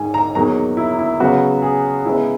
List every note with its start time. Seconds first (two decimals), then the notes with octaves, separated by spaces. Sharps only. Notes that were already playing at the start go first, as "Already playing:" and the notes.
Already playing: G#2 D#3 G#3 G#5
0.14 A#5
0.35 E2 D#3 F#3 A#3 A#5
0.77 E4
0.99 E4
1.20 C#3 F#3 B3 F#4
1.62 G#4
2.05 C#3 G#3 B3 E4